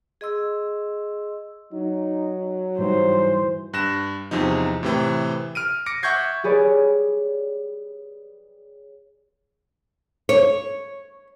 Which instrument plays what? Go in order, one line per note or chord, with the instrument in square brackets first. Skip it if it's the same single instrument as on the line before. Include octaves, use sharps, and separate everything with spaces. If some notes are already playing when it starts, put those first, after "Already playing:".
[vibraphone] G#4 D#5 C6 E6
[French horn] F#3 [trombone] D#4
[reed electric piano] G#2 G3 D#4 [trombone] E3 [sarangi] C5
[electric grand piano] G2 F#6 A#6 E7
E2 C3 F3 D#4
A2 C3 E3
F6 D7 D#7
D6 A#6 C#7 D7
E5 F#5 C#6 G6 G#6 C7
[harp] G4 G#4 B4 C#5 D5
[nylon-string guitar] C#5